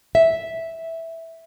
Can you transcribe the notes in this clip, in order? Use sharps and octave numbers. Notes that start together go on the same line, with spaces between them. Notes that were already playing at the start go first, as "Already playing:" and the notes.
E5